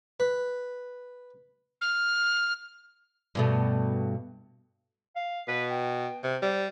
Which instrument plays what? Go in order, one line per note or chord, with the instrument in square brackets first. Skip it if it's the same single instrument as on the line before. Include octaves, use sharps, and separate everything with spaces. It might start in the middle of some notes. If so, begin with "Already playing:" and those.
[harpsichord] B4
[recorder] F6
[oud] G2 B2 A3
[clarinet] F5
[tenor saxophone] B2 [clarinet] B4
[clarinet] G5
[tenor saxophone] C3
[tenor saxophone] G3 [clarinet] C5